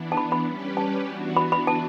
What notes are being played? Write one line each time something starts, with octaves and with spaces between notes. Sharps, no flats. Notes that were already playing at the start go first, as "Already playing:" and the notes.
Already playing: E3 B3 D4
A5
B5
B5
G3 C#4 G4 B4
A5
E3 B3 D4 F#4
B5
B5
A5